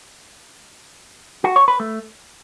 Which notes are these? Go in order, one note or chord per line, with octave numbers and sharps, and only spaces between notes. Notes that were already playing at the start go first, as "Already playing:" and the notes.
F#4
C#5
B4
A3